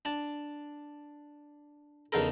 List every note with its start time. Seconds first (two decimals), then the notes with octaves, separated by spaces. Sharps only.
0.05 D4 A5
2.12 E2 C#3 D#4 A4 A#4